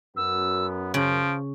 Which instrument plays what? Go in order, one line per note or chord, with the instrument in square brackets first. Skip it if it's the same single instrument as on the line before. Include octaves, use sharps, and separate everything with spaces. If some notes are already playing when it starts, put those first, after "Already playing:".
[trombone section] F#2 [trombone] B3 [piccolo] E6
[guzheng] C#3 [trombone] F3 [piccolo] D7